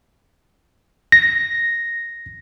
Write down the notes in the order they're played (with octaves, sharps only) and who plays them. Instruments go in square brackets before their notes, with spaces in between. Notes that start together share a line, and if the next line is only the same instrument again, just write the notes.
[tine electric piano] A#6